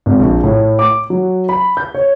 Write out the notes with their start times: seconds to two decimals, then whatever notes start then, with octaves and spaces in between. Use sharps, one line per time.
0.06 G#1
0.19 A#1
0.44 A2
0.79 D6
1.10 F#3
1.49 B5
1.77 G6
1.94 C#5